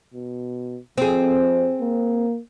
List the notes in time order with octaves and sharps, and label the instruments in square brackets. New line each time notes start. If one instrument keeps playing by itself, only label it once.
[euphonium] B2
[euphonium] F2 [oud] C4 G#4
[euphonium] A#3